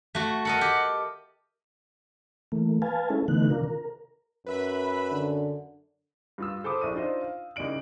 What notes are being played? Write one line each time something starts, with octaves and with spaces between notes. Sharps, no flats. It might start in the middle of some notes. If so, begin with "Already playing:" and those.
A3 F#4
A4 A#4 D#5 F#5
G4
E3 A3 A#3
B4 F5 G#5 A5
G#3 C#4 E4 A4
D3 E3 A3 B3 D#4 F#6
C3 D#3 D4 F4 A#4
A#4
F#2 B4 E5 B5
D3
G2 F4 E6
A4 C5 B5 D6 D#6
A#1 E4 D5 C#6 D#7
D4 D#4 F4 C5 D5 D#5
F5
C2 C#3 D#4 D5 D7 F#7